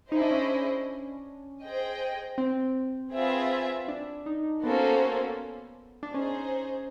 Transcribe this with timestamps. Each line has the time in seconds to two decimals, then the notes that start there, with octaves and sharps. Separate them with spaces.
0.12 D#4 E4 G#4 C5 D#5
0.21 D4
0.31 C#4
0.41 D4
1.62 G#4 C5 D#5 G5
2.38 C4
3.13 C4 F4 G#4 B4 E5
3.88 D4
4.26 D#4
4.63 A#3 B3 C#4 F#4 A4 C5
6.03 D4
6.14 C#4 D#4 G#4 C5